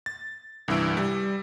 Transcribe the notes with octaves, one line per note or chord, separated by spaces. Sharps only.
A6
C2 G2 E3 E4 E6 D7
G3